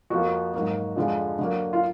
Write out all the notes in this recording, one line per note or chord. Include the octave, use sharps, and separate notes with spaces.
F2 F3 A#3 F#4
G#2 F#3 A#3
F2 D3 F3 G#3
D3 F#3 A#3
F4